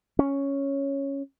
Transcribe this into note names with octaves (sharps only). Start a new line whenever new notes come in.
C#4